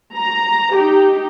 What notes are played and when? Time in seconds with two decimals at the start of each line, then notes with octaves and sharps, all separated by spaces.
0.16 A#5
0.76 D#4 G4